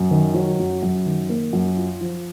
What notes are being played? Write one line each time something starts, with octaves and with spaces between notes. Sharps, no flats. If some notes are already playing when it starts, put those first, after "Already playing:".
Already playing: F#2
D#3
F#3
F#2
F#2
D#3
A#3
F#2
F4
F3